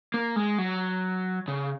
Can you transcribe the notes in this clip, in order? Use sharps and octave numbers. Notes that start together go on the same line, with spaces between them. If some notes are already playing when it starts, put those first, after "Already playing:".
A#3
G#3
F#3
C#3